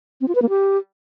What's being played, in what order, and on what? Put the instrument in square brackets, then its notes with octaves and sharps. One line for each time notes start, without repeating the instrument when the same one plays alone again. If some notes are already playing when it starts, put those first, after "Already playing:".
[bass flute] C4
F4
B4
A#3
G4